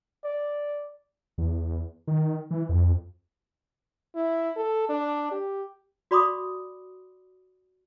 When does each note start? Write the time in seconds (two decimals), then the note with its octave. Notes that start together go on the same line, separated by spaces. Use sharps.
0.24 D5
1.38 E2
2.07 D#3
2.51 E3
2.69 F2
4.15 E4
4.56 A4
4.89 D4
5.31 G4
6.11 F#4 D5 B5 C6 D6 D#6